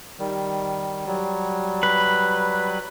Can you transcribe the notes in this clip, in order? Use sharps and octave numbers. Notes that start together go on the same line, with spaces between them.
D#3 G3
F#3 G3
B4